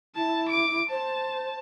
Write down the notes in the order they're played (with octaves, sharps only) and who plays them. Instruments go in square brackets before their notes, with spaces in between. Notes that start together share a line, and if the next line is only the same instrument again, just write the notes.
[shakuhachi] E4 [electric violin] A5
[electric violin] D6 D7
[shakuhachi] C5 [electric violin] A5